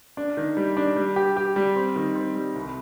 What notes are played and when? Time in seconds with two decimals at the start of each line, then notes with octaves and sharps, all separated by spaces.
0.17 D4
0.37 D#3
0.57 G3
0.77 D4
0.96 G3
1.16 G4
1.37 G4
1.56 G3
1.76 C4
1.96 D#3
2.15 C4
2.35 G3
2.55 C2